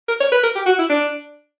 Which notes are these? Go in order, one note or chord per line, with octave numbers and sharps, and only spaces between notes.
A#4
C#5
B4
A#4
G4
F#4
E4
D4